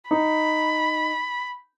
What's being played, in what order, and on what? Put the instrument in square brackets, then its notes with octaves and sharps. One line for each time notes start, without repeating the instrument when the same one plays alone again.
[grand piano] D#4 [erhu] B5